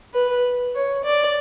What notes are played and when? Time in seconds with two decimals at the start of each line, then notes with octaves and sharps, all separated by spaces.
0.14 B4
0.75 C#5
1.05 D5